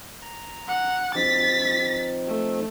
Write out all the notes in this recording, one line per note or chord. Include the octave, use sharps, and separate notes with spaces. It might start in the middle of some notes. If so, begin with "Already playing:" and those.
A#5
F#5
F3 C4 D#4 A6 B6
A3